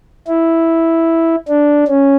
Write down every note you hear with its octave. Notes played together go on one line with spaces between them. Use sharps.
E4
D4
C#4